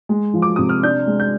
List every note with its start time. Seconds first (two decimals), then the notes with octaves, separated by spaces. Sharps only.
0.09 G#3
0.34 F3
0.42 D6
0.56 C3 D#6
0.69 F6
0.83 D4 G6
1.07 G#3
1.20 G6